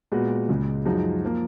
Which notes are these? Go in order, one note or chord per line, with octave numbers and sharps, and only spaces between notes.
A#2 G#3 B3 F#4
C#2 C#3 G#3
F#2 F3 G#3 D#4 F#4
F3 A#3